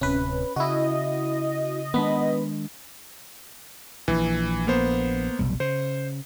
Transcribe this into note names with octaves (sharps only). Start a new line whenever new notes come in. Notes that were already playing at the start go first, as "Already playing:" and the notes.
D1 C3 C#4 B4
C#3 E4 F#4 D#5
D#3 G#3 B3 D4 B5
A#1 E3
A#3 B3 C5
F1 B1 G3
C#3 C5